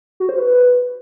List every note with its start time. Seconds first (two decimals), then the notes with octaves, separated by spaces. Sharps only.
0.20 F#4
0.29 C5
0.38 B4